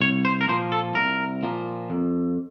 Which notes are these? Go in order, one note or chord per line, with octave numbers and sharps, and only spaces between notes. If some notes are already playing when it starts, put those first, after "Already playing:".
C2 C#5
C5
A#4
A#2 F3 A#3 C5
A4
C2 A#4
A#2 F3 A#3
F2